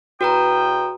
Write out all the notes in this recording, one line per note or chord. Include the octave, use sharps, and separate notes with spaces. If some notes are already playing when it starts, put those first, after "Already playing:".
E2 F#4 B4 G5 A#5 D#6